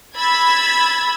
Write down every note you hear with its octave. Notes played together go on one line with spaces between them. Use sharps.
B5 E6 G#6 A6